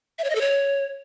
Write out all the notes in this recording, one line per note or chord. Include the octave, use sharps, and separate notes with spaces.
E5
C#5
D#5
A4
C#5